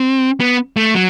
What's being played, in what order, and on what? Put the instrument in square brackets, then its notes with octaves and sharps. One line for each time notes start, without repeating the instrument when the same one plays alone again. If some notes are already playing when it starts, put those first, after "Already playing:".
Already playing: [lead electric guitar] C4
B3
A3
F#3